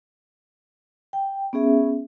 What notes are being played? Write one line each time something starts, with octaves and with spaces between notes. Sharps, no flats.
G5
B3 C#4 G#4 E5